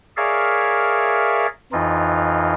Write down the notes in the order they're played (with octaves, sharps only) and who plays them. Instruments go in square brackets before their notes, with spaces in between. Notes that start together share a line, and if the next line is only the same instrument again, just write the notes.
[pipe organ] G#4 A#4 C#5 D5 E5 F5
F2 E3 D#4 F4